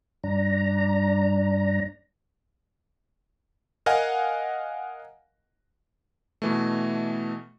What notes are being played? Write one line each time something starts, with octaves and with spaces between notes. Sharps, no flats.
G2 D4 A#5
A#4 D#5 F5 F#5 G#5
B2 E3 A3